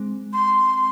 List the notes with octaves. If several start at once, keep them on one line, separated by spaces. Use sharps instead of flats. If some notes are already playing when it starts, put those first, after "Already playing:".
Already playing: G#3 C4
C6